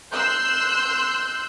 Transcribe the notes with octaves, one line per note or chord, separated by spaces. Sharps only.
C6 E6 F#6 G6